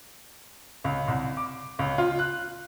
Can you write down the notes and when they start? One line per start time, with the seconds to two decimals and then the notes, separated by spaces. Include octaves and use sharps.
0.84 C#2
1.08 C2
1.37 D6
1.79 C#2
1.98 F4
2.19 F#6